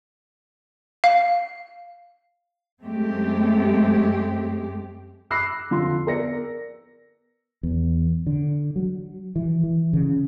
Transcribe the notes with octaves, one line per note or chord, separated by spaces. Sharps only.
F5
F#2 G#3 A3 C4 G4
B5 D6 E6 F#6 A#6 C7
F2 D3 F4 C6
B3 A#4 D5 A#6 C#7
E2
D3
F#3
E3
E3
C#3